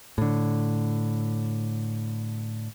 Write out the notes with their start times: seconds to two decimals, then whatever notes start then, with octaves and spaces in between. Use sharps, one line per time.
0.18 A2 D3